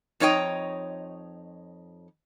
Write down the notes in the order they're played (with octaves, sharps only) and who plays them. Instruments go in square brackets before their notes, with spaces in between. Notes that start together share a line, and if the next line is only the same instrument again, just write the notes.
[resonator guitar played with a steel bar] F2 D#4 C#5 D#5 G5